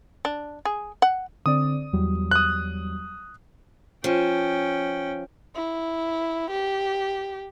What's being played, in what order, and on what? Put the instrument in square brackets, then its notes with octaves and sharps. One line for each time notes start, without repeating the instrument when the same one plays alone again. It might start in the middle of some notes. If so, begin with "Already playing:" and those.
[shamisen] D4
G#4
F#5
[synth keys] D3 C4 D5 [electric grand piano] D#6
[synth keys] E2 F#3 G3
[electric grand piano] D#6 F#6
[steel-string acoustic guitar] F3 [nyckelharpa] C#4 G5
[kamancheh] E4
G4